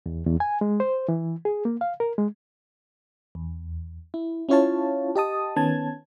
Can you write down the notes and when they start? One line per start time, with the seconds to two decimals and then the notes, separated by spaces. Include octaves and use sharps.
0.06 E2
0.27 E2
0.40 G#5
0.61 G#3
0.80 C5
1.09 E3
1.45 G#4
1.65 A#3
1.81 F5
2.00 A#4
2.18 G#3
3.35 E2
4.14 E4
4.49 C#4 E4 F4 C#5 F5 A5
5.16 G4 D#5 A5 D#6
5.56 D#3 B3 C#4 A5 G#6